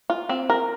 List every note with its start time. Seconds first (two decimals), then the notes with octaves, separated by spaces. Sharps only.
0.10 F4
0.29 C4
0.50 A#4